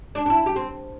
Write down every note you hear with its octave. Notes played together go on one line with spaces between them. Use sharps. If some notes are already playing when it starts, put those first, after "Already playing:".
D4
D4
E4
G4
C4